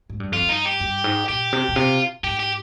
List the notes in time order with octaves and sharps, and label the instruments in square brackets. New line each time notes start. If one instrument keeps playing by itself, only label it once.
[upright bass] G#2
G2
[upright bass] F2 [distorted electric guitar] F4
[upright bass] G2
[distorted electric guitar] D#4
G4
[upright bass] G2
G#2
[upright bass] A#2 [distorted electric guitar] G4
[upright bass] C3
A#2
[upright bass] C3 [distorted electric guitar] F4
[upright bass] G#2 [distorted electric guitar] G4
[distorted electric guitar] G4